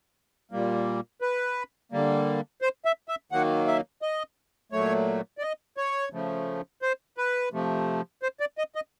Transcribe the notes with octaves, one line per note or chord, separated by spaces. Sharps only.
A#2 G3 A#3
B4
D3 G3 A#3
C5
E5
E5
D#3 F#3 A#3 F#5
E5
D#5
A#2 F#3 A3 C#5
D5
D#5
C#5
C#3 F3 A3
C5
B4
C3 F3 A3
C5
D5
D#5
D#5